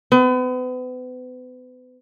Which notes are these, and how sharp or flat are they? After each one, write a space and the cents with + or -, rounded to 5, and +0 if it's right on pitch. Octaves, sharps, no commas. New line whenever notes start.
B3 +40